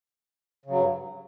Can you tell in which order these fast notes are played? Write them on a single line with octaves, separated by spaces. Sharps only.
C#3 F#3 G2